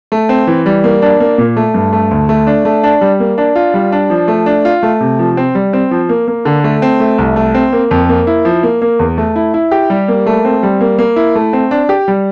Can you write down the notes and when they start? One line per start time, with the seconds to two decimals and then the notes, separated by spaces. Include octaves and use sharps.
0.12 A3
0.29 C4
0.47 E3
0.66 G3
0.84 A#3
1.02 D4
1.20 A#3
1.38 A#2
1.57 A3
1.74 G2
1.93 A3
2.11 D2
2.29 A3
2.47 D4
2.65 A3
2.83 D4
3.01 G3
3.20 A#3
3.38 D4
3.56 F4
3.74 G3
3.92 D4
4.10 F3
4.28 A3
4.46 D4
4.65 F4
4.83 A3
5.00 C3
5.19 F3
5.37 C4
5.55 G3
5.73 C4
5.91 F3
6.09 A#3
6.28 A#3
6.45 D3
6.64 A3
6.82 C4
7.00 A3
7.18 C2
7.36 A3
7.54 C4
7.73 A#3
7.91 F2
8.09 A#3
8.27 E4
8.45 F3
8.63 A#3
8.82 A#3
8.99 E2
9.18 A3
9.36 E4
9.54 E4
9.71 G4
9.90 G3
10.08 A#3
10.27 A3
10.45 C4
10.63 G3
10.81 A#3
10.99 A#3
11.16 E4
11.35 A3
11.53 C4
11.71 D4
11.89 G4
12.08 G3